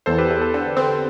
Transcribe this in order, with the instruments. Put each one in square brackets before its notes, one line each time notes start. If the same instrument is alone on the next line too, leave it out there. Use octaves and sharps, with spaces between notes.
[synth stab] E2 [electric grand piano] A4 C5
[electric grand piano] G4 B4
[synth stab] E2 [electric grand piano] A4
[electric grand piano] A4
[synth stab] D3
C4